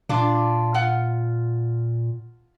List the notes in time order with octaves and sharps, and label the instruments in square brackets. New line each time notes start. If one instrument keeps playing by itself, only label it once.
[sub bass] A#2 [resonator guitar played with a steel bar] D4 F4
[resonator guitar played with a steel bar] F4 F#5